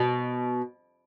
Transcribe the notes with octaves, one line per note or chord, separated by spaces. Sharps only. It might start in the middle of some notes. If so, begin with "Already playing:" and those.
Already playing: B2